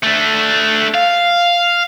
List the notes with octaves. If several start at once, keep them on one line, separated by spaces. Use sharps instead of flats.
A3 D4
F5